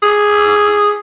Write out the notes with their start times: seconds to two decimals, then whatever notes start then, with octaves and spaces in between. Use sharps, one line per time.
0.03 G#4